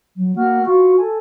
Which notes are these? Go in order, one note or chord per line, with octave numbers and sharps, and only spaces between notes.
F#3
A#3 F#4 F6
F4 F#4 C#6
A4 G#5